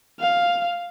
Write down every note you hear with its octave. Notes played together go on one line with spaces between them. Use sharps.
F5